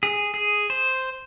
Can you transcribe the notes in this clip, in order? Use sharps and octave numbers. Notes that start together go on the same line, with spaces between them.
G#4
G#4
C5